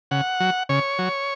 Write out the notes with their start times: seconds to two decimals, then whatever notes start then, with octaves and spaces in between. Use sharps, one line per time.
0.11 C#3 F#5
0.40 F#3
0.69 C#3 C#5
0.99 F#3